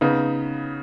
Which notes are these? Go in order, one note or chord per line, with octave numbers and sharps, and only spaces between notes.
C#3 B3 D#4